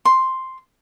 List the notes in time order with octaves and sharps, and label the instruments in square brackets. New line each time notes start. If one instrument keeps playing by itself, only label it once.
[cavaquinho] C6